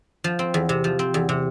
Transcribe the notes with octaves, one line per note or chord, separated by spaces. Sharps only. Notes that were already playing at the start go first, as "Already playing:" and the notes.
F3
C4
E2
C3
F3
C4
E2
C3